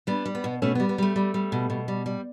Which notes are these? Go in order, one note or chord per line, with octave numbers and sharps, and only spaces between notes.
G3 B3 D4
G3
B3
B2
B2 A3 C#4
G3 B3
B3
G3 A3
G3
G3
B2
B2
G3
G3